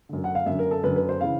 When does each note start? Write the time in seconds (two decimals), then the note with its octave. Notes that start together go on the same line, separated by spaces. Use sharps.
0.09 F#2 D3
0.24 F#5
0.35 F5
0.46 F#2 D3 E5
0.59 A#4
0.71 A4
0.83 F#2 D3 B4
0.96 B4
1.09 C5
1.21 C#3 E3 F5